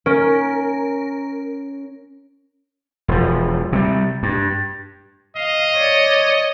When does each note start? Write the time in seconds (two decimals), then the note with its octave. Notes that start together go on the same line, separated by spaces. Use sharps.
0.06 C#4 A#4
3.08 E1 F3
3.73 C3 G3
4.23 G2
5.36 D#5 F5
5.76 C#5 D5